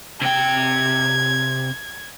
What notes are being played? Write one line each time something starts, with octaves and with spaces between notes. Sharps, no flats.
C3 G5 G#6